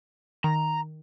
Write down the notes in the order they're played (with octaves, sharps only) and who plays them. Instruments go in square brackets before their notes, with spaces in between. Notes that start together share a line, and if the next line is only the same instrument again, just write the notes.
[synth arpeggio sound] D#3 [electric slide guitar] A#5